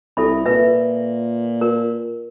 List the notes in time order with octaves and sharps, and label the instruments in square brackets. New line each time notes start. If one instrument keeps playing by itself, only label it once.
[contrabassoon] C2 [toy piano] A4 E5 B5
[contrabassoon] A#2 [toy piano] B4 E5
[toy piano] A#4